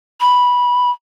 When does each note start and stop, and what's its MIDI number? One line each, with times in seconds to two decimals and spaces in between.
0.21 0.91 83